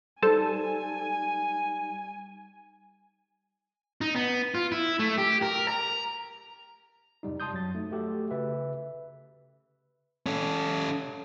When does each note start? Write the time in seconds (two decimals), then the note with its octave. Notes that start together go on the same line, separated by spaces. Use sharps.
0.22 G3 D#4 A4 C5 G#5 A5
4.01 D#4
4.16 B3
4.55 F4
4.72 E4
4.99 A3
5.18 G4
5.42 A#4
5.68 A#5
7.23 F2 C3 G3 D#4
7.40 A5 C6 D#6 G6
7.52 F#2 F#3 A6
7.74 A3 D#4
7.91 A3 F#4 G4 A4
8.31 C#3 B4 E5
10.26 C#4 A4